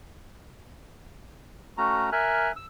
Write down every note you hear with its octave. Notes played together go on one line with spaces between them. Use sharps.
A3 C#4 F#4 A#5
A#4 E5 G#5 F6 F#6
E6